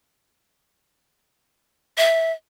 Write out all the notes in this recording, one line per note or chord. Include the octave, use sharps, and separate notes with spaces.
E5